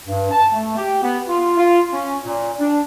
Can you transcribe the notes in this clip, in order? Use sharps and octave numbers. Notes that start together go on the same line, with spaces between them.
G2
A5
A3
G4
B3
F4
F4
C#4
A#2
D4